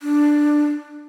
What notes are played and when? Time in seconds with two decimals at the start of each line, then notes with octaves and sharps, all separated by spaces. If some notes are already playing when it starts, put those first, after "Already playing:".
0.02 D4